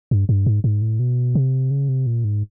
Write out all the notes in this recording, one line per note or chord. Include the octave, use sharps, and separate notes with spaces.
G2
G2
G#2
G#2
A2
B2
C3
C#3
C3
A#2
G#2